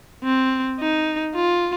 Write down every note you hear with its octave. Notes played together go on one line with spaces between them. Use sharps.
C4
D#4
F4